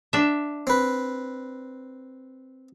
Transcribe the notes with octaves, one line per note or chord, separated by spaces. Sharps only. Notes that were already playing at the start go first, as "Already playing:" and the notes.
D4 E5
C4 B4